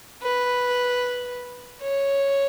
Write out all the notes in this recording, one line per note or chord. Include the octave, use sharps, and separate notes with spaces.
B4
C#5